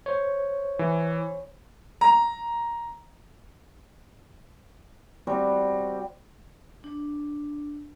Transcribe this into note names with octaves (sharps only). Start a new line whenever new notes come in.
C5 C#5
E3
A#5
G3 C4 F#4
D4